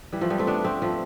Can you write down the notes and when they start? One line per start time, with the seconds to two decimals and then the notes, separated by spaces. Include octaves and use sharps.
0.12 E3 G3
0.21 F3 A3
0.30 G3 B3
0.38 A3 C4
0.47 B3 D4
0.65 A3 C4
0.82 F3 A3